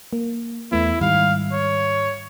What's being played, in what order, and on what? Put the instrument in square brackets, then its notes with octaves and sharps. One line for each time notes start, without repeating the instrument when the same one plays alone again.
[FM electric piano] A#3
[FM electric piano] E2 A3 B3 [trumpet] E4
[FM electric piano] G#2 D#3 G3 [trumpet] F5
[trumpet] C#5